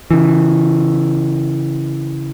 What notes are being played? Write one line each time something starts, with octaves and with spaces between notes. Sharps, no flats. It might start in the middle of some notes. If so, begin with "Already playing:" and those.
C#3 E3